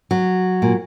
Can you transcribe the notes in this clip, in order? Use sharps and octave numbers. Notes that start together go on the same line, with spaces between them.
F#3
A#2